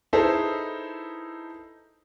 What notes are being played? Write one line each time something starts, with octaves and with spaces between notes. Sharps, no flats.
D#4 E4 G#4 A4 B4 C5